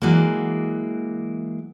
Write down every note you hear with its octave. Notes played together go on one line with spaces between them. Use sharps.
E3 F#3 G#3 A#3